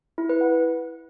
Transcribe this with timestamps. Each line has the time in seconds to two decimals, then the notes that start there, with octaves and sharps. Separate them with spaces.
0.18 E4
0.29 B4
0.41 F#5